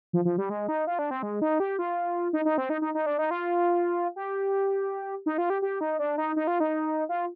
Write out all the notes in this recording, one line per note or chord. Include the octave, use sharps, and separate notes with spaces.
F3
F3
G3
G#3
D#4
F4
D4
C4
G#3
D#4
G4
F4
D#4
D#4
C4
D#4
D#4
D#4
D4
D#4
F4
G4
D#4
F4
G4
G4
D#4
D4
D#4
D#4
F4
D#4
F4